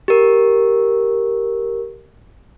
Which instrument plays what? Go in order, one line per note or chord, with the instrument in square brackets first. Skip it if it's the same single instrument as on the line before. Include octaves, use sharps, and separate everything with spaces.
[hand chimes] G4 A#4